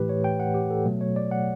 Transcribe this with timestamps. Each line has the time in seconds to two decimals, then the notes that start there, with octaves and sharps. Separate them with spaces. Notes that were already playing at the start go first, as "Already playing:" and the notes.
Already playing: A2 E3 A3 G4 B4
0.09 C#5
0.24 G5
0.40 F#5
0.55 G4
0.71 A4
0.85 B2 F#3 A3
1.01 C#5
1.16 D5
1.31 F#5